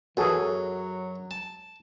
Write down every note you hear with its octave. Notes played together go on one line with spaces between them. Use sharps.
F#2 E3 F#4 G#4 A4
F#3
A5